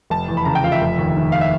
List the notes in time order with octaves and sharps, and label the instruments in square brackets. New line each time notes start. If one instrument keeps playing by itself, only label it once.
[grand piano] F1 A5
E2
B5
C#3 A#5
G5
F3 F5
E5
F1
D#2
D#3
F5
E5